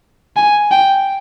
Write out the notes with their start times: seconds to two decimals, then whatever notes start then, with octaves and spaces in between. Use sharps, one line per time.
0.36 G#5
0.71 G5